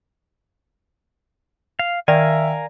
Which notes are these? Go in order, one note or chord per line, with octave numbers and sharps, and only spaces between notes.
F5
D#3 A#4 D5 E5 F5 G#5